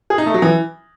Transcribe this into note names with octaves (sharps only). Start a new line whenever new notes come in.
G#4
D#4
A3
F#3
E3